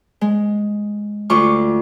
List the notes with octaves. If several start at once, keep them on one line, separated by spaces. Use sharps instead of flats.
G#3
D2 F4 C#6 D6